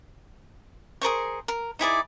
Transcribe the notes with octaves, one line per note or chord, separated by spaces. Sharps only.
G#4 A#4 C5 C#6
A#4
D#4 E4 G#4 D5